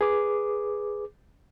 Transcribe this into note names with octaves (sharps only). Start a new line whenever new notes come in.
G#4 B4 D6